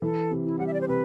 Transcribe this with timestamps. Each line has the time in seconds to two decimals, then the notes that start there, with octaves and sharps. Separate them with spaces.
0.02 E3 A4
0.31 C3
0.44 E4
0.59 G3 F#5
0.67 E5
0.74 D5
0.81 C5
0.88 C3 B4